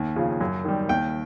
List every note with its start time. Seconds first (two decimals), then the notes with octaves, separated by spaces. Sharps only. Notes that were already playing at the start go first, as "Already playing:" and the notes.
Already playing: D#2
0.16 C#3 F3
0.41 F#2
0.64 D#3 G3
0.89 D#2 G5